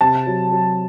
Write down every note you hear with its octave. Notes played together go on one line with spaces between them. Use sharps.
C3 A5
F#3
F#3